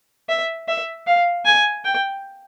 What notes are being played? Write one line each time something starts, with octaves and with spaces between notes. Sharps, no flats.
E5
E5
F5
G#5
G5